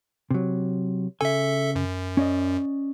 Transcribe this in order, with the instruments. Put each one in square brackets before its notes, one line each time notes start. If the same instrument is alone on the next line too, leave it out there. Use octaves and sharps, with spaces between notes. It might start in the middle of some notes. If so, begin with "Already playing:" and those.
[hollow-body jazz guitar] C3 F#3
[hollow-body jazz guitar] C#3 G#5 [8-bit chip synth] A4 E5
[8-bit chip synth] F#2
[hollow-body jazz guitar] C#4 D5 D#5